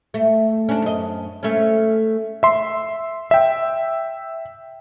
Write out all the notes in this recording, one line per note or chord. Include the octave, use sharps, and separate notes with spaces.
A3
C#4 D4
F#2 D#5
A3 C#4
E5 C6
E5 G5